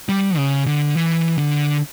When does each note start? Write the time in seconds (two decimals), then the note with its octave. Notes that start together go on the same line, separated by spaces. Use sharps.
0.09 G3
0.37 C#3
0.67 D3
0.95 E3
1.38 D3